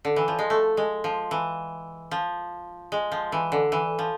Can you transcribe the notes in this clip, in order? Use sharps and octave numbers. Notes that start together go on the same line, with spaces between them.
D3
E3
F3
G#3
A3
G#3
F3
E3
F3
G#3
F3
E3
D3
E3
F3